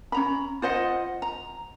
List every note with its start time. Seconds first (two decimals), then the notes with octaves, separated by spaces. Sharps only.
0.12 C#4 A#5 B5
0.62 F4 C5 D#5 F#5
1.22 A#5